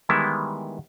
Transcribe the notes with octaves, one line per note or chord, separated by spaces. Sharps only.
D#3 E3 G3 G#3 B3 E4